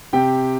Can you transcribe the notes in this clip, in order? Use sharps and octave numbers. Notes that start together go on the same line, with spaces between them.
C3 G4 G5